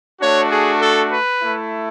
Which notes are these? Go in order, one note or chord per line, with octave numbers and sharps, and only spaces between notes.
A3 D4 F#4 C#5
G#4
A4
B4
A3 E4